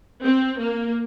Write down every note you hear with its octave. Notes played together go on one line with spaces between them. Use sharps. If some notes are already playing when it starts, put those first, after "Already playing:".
C4
A#3